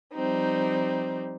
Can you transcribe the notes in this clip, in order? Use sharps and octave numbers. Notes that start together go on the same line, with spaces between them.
F3 G3 C4 D#4